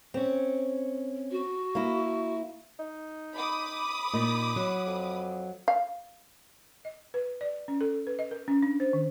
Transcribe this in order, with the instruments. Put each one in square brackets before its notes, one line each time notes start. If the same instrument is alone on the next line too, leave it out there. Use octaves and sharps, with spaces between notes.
[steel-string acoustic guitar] C4 C#4
[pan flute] F#4
[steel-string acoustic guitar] A#3 E4
[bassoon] D#4
[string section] B5 D6 D#6
[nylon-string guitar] A#2 [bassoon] D#4
[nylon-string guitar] F#3
[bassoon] F2
[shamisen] F5
[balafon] D#5
B4
D5
C#4
A4
B4
D#5
A#4
C#4
D4
C5
D#3